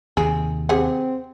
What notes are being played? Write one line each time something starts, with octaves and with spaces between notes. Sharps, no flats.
D#2 C3 G#4
C4 G4 G#4 F#5